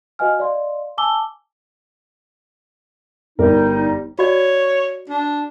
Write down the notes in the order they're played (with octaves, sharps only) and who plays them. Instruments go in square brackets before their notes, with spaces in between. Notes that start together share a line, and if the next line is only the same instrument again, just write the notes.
[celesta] F#4 B4 D#5 F5 G#5 F6
D5 D#5 F5 C6
G#5 A5 D6 E6 G7
[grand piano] G1 A#4 [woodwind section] G3 D#4
[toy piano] F#4 D5 [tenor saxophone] C#5
[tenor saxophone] D4